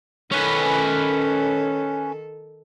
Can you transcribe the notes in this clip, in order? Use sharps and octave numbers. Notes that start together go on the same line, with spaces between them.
D#3 C#4 A4 B4